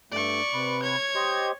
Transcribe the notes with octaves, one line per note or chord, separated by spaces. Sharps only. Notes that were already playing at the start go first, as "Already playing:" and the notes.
G2 A3 D5 C#6
C3 B4
C#5 G#6
G4 C5 D#5